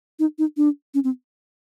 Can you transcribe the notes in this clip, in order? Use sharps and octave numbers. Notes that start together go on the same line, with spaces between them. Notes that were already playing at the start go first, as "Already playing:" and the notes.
D#4
D#4
D4
C#4
C4